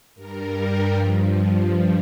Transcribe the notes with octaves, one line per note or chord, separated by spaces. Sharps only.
G2 G3 A#4
G4
G2 F3